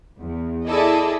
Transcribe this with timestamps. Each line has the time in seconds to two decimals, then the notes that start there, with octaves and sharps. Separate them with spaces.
0.20 E2
0.66 E4 G#4 A4 D5 D#5